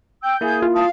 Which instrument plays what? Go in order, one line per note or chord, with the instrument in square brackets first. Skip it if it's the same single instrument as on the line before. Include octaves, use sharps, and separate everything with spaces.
[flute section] G5 E6 [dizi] G6
[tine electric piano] A#3 E4 [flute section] G#4
[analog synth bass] F4
[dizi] F5 [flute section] A5 D#6